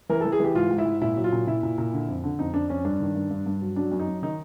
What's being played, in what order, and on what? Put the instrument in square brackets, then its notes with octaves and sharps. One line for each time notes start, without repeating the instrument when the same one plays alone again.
[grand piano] E3 A#4
A4
E3
G#4
E3 G4
G#2 F4
G#2
E4
G#2
A#2 E4
F#3
F4
A#2
A#2 E4
A#2
A#2
D3
F2
D3
F2 D#4
F2 D4
F2 C#4
G2 D4
D#3
G2
G2
G2
F#3
F#3 D4
F#2
D#4
F#2
D#3 D#4